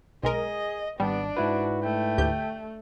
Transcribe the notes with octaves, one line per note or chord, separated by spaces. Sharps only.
B1 G#3 G#4 A#4 D#5
G#1 G3 B3 D4
G#2 E4 F#4 B4
A3 G5
D2 G4 G6